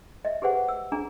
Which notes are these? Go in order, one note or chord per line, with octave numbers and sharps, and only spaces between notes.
D#5 E5
G4 G#4 B4 C5 F#5
E6
D4 G#4 A#5